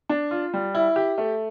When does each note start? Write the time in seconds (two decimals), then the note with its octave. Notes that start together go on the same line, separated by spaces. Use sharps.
0.09 D4
0.31 F4
0.53 G3
0.75 E4
0.96 G4
1.18 A3